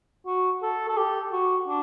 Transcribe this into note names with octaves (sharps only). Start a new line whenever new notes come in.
F#4
A4
A4
G4
F#4
D4